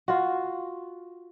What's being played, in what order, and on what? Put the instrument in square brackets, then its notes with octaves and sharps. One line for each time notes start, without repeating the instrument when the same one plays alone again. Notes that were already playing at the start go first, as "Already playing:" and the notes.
[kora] F4 F#4